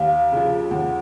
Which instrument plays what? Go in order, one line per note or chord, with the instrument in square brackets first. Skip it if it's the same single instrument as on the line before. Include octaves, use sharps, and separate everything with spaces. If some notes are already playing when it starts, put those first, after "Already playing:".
Already playing: [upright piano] D#2 [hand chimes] F5
[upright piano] C#3 F3
[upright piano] D#2 [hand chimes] F#5